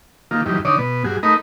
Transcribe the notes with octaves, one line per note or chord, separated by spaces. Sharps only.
D#3 A#3 F4
F#2 D#3 E3 G3
D3 D#3 C#5 D5 D#6
B2 B3
G2 F#4 G#4
A3 D#4 A#4 D#5 B5